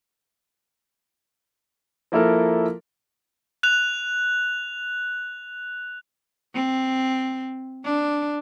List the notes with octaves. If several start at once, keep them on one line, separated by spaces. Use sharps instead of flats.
F3 A#3 E4 A4 A#4
F#6 F7
C4
D4